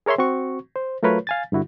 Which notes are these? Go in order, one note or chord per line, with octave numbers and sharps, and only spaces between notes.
G#4 A#4 C#5 E5 C6
C4 F#4 C#6
C5
F#3 A3 F4 A#4 B4 C#5
F5 G#5 A6
G2 D3 E4 F#4